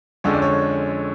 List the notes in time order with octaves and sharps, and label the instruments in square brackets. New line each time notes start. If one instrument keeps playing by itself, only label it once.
[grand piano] F2 D3 F3 G#3 C#4 C#5
D5
C#5